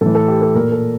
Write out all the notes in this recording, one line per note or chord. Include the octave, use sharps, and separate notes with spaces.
A2 E3 A4
A4
G4
A4
A#2 A#4
A4